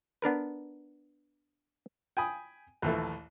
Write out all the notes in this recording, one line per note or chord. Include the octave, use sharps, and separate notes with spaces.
B3 D4 A#4 B4
G5 G#5 B5 D#6
A#1 D#2 E3 A3